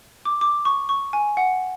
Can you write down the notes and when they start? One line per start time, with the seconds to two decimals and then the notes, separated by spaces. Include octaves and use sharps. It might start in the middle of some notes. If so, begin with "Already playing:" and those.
0.25 D6
0.41 D6
0.65 C#6
0.89 C#6
1.13 G#5
1.37 F#5